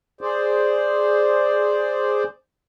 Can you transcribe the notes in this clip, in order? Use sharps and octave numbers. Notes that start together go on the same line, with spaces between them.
G#4 C5 D5